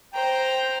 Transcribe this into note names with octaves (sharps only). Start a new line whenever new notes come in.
C5 G5 A#5